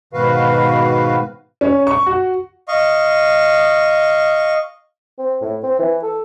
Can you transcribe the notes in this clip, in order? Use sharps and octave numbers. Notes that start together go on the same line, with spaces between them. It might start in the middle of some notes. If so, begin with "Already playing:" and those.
G#2 B2 D#3 F#4 B4 F5
C#4
C#6
F#4
D#5 F5 C#6
C4
A2
C4
E3
A4